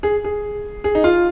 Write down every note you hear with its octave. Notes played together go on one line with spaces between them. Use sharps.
G#4
G#4
G#4
D#4
F4